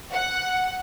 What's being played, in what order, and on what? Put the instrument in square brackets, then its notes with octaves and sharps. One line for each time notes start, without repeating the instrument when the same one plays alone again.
[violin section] F#5